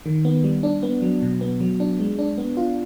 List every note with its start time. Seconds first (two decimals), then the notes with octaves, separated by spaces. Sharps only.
0.06 D#3
0.25 B3
0.44 G3
0.63 D4
0.83 B3
1.02 F#3
1.22 B2
1.41 B3
1.60 F#3
1.80 D4
2.00 G#3
2.19 D4
2.38 B3
2.57 F4